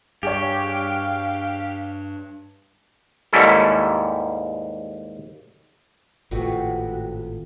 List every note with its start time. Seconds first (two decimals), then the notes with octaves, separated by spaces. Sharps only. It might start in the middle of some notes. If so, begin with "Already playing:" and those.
0.23 G2 G4 G#4 C#5 F5
3.33 D#2 G#2 G3 C#4 E4 A4
6.31 G#1 A2 C3 F4 F#4 A4 B4